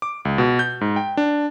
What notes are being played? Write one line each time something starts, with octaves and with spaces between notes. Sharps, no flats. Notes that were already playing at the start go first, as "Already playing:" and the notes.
D6
C#2
B2
G6
G#2
G5
D4